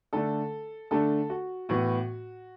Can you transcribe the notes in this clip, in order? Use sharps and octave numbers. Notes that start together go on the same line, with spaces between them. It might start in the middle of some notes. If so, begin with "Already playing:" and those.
D3 A3 D4 A4
D3 A3 D4 A4
F#4
A2 E3 B3 F#4